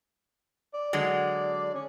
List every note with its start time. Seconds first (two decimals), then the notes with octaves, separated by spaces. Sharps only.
0.74 D5
0.93 D3 F#3 G#3
1.74 C#4